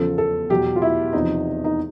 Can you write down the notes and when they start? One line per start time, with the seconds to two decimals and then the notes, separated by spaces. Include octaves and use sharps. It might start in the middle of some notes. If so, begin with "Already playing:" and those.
Already playing: E2 C#3 F3 A4
0.18 A4
0.50 E2 B2 F#3 G4
0.76 F4
0.82 E4
1.13 E2 C3 F3 D#4
1.64 D#4